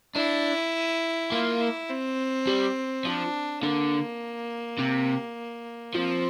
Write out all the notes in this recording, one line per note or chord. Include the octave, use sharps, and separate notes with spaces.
D4 E4
A#3 F4
E4
C4
G3
F3 D4
D3 A#3
C3
F3 C4